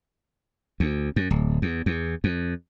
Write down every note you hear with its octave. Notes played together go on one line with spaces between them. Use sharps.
D2
F#2
D1
E2
E2
F2